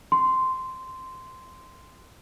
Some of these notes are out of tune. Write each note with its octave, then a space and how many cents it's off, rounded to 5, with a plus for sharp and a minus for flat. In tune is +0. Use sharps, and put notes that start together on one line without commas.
C6 -10